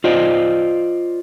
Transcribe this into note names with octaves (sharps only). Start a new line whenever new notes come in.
F4 C5 D5 D#5